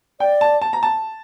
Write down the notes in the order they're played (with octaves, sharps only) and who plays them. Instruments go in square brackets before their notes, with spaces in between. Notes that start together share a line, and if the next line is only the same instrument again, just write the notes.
[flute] D5 [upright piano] G5
[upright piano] A5
A5
A#5
A5